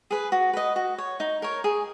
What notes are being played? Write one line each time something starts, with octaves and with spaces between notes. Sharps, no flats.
G#4 B4
F#4
B4 D#5
F#4
C#5
D#4
A#4 C#5
G#4